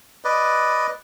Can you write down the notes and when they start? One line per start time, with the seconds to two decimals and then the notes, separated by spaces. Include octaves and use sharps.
0.24 B4 D5 D#5